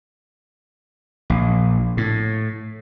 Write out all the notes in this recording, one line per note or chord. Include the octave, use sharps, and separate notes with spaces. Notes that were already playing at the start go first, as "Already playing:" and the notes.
A#1
A2